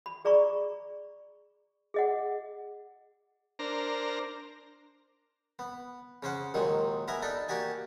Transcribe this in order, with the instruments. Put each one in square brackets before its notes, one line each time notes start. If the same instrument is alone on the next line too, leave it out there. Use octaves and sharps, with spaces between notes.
[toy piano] B5
G#4 D5 A#5 B5 C#6
G#4 D#5 F#5
[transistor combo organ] D4 A#4 C5 A#5
[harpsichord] B3
C#3 C#4 C5 F#5
D#2 A#2 D#3 F#3 G#3
B3 A#4 E5 G#5 A#5
D4 D#4 A4 D5
A#3 F#4 G4 D5 G#5